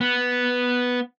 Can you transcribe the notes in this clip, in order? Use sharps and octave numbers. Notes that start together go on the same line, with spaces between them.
B3